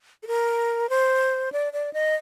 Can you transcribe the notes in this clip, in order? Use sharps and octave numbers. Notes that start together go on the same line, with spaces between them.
A4
A#4
C5
D5
D5
D#5